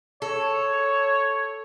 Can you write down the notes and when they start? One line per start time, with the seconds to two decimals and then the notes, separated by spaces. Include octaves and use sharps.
0.22 A4 C#5